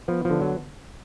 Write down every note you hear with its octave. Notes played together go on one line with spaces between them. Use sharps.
F3 B3
D3 F3
F#3